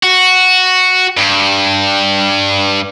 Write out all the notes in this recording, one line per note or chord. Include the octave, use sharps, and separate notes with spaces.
F#4
G2